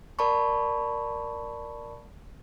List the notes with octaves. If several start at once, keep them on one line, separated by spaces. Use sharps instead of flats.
A#4 D5 A5 B5 C#6